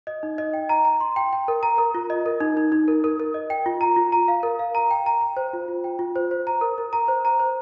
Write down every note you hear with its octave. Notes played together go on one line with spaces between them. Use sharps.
D#5
D#4
D#5
G5
A#5
A#5
C6
G5
G5
A#4
A#5
A#4
F4
D#5
A#4
D#4
D#4
D#4
A#4
A#4
A#4
D#5
G5
F4
A#5
F4
A#5
F5
A#4
F5
A#5
G5
A#5
G5
C5
F4
F4
G5
F4
C5
C5
A#5
A#4
A#4
A#5
C5
A#5
C5